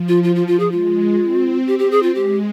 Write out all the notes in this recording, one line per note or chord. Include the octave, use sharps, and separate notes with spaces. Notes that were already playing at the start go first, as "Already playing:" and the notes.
Already playing: F3
F4
F4
F4
F4
G#4
G#3 F4
C4
C4 G4
G4
G#4
F4
G#3 G4